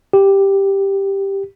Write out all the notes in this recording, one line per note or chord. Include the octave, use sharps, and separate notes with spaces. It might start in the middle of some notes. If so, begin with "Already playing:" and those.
G4